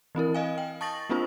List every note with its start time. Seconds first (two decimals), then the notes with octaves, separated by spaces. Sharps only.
0.15 E3 C4 E4 A#4
0.34 D#5 F5 G#5
0.58 G5
0.81 A5 C#6 D#6 A6 A#6 F#7
1.10 A#3 C4 D4 F4 C5